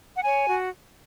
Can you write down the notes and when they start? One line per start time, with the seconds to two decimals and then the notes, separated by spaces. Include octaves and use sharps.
0.16 F#5
0.22 C#5 G#5
0.46 F#4